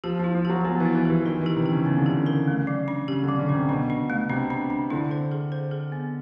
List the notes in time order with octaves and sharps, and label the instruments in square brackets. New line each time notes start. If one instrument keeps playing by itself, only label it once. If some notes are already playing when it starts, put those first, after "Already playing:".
[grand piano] F3 [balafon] G4
[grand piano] F3 [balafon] E4
[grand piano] F3
[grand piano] F#3 [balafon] G4
[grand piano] F#3 [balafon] B3
[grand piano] E3
[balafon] B3
[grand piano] E3
[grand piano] E3 [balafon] G4
[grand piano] D#3 [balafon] A#4
[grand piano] E3 [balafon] G4
[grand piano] C3
[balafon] G4
[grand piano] C#3
[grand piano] C#3 [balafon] B3
[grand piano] D3
[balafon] G4
[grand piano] C#3
[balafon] A#4
A3
F#3
D4
[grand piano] C#3 [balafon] G4
[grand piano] D3
[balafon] F#3
[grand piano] C#3
[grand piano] C#3 [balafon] D4
[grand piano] C3
[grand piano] B2 [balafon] D4
[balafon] D4
A3
[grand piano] C3 [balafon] D4
[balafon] D4
D4
[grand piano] D3 [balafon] E4
[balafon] C5
G#4
C5
G#4
B3